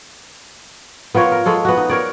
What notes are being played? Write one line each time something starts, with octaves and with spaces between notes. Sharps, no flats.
B3 F4 A#4 C#5
A#4
G#3 A4 C#5
B3 F#4
D#4
A#4 C#5 D5